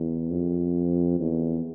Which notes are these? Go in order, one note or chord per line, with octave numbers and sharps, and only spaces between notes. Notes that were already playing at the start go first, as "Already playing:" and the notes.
Already playing: E2
F2
E2